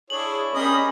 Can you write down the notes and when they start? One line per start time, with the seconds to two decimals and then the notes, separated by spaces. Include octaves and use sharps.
0.10 D4 E4 G#4 C#5 F#7
0.53 G3 C#4 G#4 A#4 D#5 B5